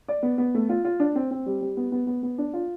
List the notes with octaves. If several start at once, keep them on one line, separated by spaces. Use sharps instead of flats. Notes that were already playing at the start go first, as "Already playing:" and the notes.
D5
B3
B3
A3
F4
F4
D4
C4
C4
G3
G3
B3
B3
B3
B3
D4
F4